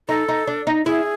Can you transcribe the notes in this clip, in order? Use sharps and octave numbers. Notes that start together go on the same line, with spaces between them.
D#4 A4
D#4
D4
D#4
E4 G#4